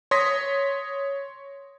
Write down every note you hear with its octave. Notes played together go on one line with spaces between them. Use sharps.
C#5 C6 D#6 A#6 B6